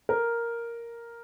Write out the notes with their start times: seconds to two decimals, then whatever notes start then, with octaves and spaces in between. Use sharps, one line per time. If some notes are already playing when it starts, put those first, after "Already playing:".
0.09 A#4